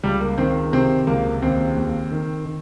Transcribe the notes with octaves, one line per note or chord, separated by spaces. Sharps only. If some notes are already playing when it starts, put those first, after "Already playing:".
C#2 G3
A#3
D#3 C4
C3 C4
C#2 A#3
D#2 C4
D#2
D#3
D#3